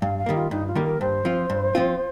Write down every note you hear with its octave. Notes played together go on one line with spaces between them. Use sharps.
G2 F5
F5
D#3 G3 A#3
F4
G2 D#4
F4
D#3 G3 A#3
A#4
G2 C5
F3 C4 F4
G2
F3 C4 F4